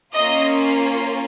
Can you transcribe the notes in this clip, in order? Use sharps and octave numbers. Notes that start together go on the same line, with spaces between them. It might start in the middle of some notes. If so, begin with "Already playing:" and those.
A#3 C#4 F4 D#5